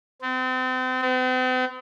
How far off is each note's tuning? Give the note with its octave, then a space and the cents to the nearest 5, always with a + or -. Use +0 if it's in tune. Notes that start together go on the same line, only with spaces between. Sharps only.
C4 -35
C4 -45